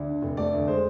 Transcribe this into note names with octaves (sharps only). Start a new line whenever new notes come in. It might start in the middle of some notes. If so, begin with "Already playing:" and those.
Already playing: D2 D5
D3
F1
A3 D5
D2
G#3 C5